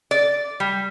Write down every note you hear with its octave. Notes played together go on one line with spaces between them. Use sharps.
D5
G3